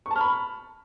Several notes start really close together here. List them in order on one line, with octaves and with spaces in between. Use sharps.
C#6 A5 F6 B5